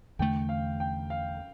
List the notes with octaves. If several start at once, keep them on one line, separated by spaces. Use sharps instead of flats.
E2 D3 A3 G5
F5
G5
F5